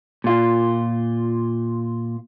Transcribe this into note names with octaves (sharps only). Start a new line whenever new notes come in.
A#2 F4